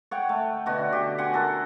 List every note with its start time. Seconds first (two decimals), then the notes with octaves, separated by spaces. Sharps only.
0.11 C#5 F#5 G5
0.29 A3
0.66 B2 D3 F#4
0.92 G4
1.18 F#5 G#5 C6
1.33 F#4 A4 A#4